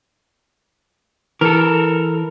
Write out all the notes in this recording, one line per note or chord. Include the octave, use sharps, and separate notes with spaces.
E3 A4 A#4